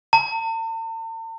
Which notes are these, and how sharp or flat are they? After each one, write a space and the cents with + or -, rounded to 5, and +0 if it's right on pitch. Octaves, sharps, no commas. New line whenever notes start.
A5 +45